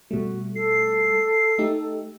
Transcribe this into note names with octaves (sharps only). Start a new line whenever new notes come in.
B2 G3 A3 F#4
A4 C7
A3 D#4 G4